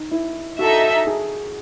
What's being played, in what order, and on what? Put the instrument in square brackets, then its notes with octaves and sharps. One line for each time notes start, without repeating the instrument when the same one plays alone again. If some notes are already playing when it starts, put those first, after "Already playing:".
Already playing: [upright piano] D#4
E4
[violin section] D#4 A4 E5 [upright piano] F#4
[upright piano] G#4